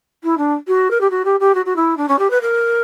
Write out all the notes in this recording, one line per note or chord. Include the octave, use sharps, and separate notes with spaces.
E4
D4
F#4
A#4
G4
F#4
G4
G4
F#4
F#4
E4
D4
C#4
G4
B4
A#4